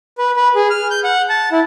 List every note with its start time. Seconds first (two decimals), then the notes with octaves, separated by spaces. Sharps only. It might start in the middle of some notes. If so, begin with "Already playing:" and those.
0.18 B4
0.36 B4
0.56 G#4
0.70 F6
0.90 G6
1.04 F#5
1.30 A5
1.52 E4